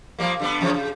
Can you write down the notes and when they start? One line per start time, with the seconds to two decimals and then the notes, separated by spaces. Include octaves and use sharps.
0.19 F3 G3 A#3
0.39 D3 G3 B3
0.61 F2 C#3 F3
0.74 C#3